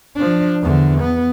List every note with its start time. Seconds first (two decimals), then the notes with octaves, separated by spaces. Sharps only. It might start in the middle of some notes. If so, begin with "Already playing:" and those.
0.16 F3 D4
0.62 E2 D3
1.01 B3